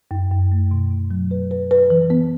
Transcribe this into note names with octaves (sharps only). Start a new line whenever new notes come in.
F#2
F#2
A3
B2
B2
F#3
B4
B4
B4
E3
B3